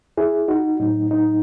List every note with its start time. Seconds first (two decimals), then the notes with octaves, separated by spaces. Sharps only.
0.17 E4 G#4
0.48 D#4 F#4
0.80 A2 F#3 D#4
1.11 D#4